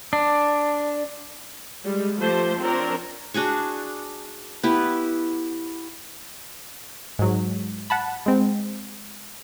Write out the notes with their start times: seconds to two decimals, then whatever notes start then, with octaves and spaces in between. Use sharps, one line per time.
0.13 D4
1.84 G3 G#3
2.19 F3 A3 G4 C5 A5
2.59 F3 C4 D4 A#4 C#5
3.34 D4 F#4 G#4 C#6
4.63 B3 E4 G4
7.19 G#2 F#3
7.90 F#5 A5 B5
8.26 G#3 C4